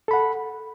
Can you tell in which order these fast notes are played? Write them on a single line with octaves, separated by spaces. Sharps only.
A4 B5 F#5